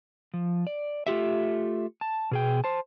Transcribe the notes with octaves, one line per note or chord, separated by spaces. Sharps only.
F3
D5
A3 F4 G4 E5
A5
B2 G#4 G5
C5 A5